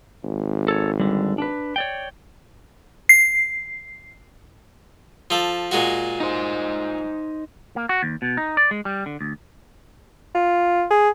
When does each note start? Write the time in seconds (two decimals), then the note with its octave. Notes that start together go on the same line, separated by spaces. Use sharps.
0.23 G#1
0.68 A4 C#5
1.00 D3 G3
1.38 D4 B4
1.76 C#5 D5 G5
3.09 C7
5.30 F3 A4
5.71 A#2 G#3 F#4
6.20 D#4 C5
7.76 A#3
7.89 F#4
8.03 D#2
8.22 B2
8.37 D#4
8.57 D5
8.71 G#3
8.85 G3
9.06 D3
9.21 D2
10.35 F4
10.91 G#4